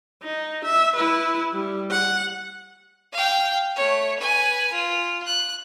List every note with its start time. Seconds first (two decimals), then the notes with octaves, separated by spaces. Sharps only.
0.23 D#4
0.65 E5
0.96 E4 B4
1.53 G3
1.91 F#5
3.13 F5 G5
3.76 A3 C#5
4.19 B4 G#5
4.72 F4
5.26 F#6